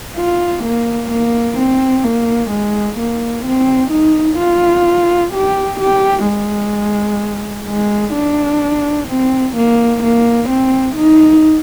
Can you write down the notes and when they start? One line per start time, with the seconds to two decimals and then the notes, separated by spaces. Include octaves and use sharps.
0.16 F4
0.64 A#3
1.11 A#3
1.58 C4
2.04 A#3
2.51 G#3
2.98 A#3
3.45 C4
3.91 D#4
4.39 F4
5.33 G4
5.80 G4
6.26 G#3
7.67 G#3
8.14 D4
9.08 C4
9.56 A#3
10.03 A#3
10.49 C4
10.96 D#4